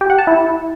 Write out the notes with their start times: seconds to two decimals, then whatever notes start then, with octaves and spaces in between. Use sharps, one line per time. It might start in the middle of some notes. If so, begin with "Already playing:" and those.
0.01 G4
0.10 F#5
0.18 A5
0.27 E4